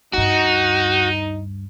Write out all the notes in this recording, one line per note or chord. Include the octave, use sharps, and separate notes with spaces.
D2 G2 D#4 F#4